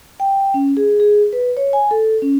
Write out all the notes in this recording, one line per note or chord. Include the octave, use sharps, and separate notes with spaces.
G5
C#4
G#4
G#4
B4
C#5
G#5
A4
C#4